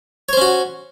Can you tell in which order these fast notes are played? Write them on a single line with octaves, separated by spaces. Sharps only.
C#5 C5 C#4 F#4